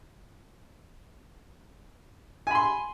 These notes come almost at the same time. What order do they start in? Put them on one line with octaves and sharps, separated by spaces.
G#5 B5 C6